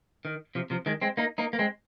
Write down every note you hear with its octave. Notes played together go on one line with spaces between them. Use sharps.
D#3
C3 F3
C3 F3
D#3 G#3
G#3 C4
A#3 D#4
A#3 D#4
A#3
G#3 C4